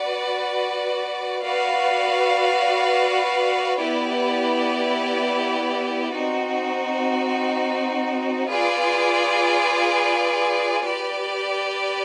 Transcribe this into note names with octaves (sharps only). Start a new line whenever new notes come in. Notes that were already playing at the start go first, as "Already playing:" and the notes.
Already playing: F#4 B4 D5
F#4 B4 D5 F5
B3 E4 G4 B4 D5
C4 D#4 F#4
F4 G#4 B4 D5
G4 B4 D5